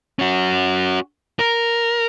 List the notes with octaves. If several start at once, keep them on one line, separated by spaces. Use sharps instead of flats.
C#4 F#4
A#4